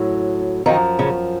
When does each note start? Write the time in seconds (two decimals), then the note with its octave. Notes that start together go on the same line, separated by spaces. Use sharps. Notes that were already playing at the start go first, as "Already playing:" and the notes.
Already playing: A2 F#3
0.66 F#2 D#3 F3 D#4
0.99 C#3 C#4